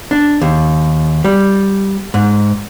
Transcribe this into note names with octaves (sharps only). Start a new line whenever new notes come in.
D4
D#2
G3
G#2